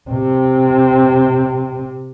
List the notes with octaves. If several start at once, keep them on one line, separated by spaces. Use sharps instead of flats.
C3 C4